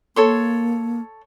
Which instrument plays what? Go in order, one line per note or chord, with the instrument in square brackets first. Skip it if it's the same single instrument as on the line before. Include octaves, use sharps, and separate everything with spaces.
[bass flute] A#3 [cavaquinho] A4 C#5 C6